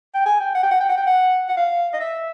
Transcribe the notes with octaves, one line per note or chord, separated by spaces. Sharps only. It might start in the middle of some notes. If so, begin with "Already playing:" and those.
G5
G#5
G5
F#5
G5
F#5
G5
F#5
G5
F#5
F#5
F5
D#5
E5